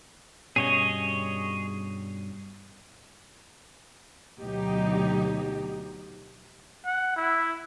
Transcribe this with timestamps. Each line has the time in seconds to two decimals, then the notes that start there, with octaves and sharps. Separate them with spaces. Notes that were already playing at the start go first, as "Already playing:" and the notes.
0.56 G2 B2 C#4 G#4 C#5 D#5
4.39 D2 B2 F#3 D#4 G4
6.85 F#5
7.16 E4